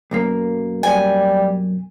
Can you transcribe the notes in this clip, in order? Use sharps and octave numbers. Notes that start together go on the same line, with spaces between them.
B1 F#2 A#3
G3 G#5